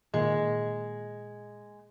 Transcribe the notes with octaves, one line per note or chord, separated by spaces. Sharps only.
A#2 D#3 G#3